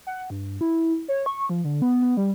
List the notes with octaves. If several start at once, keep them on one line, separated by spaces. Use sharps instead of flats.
F#5
G2
E4
C#5
C#6
F3
D3
B3
B3
G3